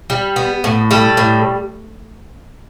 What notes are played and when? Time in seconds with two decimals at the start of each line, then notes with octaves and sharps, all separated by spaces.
0.10 G3
0.36 B3
0.64 A2
0.91 G3 A4
1.17 A2